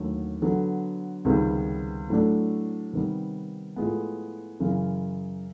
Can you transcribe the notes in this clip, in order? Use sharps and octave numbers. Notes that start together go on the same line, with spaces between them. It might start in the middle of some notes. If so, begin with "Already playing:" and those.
Already playing: D#2 D3 F#3 A3
D3 F#3 B3
C#2 C3 D#3 G3 B3
A2 F#3 A3 D4
C3 D#3 G3 B3
A2 F3 G#3 B3
F#2 C#3 E3